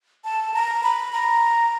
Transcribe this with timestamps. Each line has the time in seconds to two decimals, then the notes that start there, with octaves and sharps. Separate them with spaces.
0.24 A5
0.54 A#5
0.83 B5
1.13 A#5